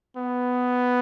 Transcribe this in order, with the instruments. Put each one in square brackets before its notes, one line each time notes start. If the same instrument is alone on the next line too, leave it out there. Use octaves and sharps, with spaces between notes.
[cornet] B3